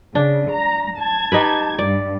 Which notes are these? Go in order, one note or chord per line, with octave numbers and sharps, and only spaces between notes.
C#3 D4
A#5
A5 G#6
D#4 G4 B4
G2 D5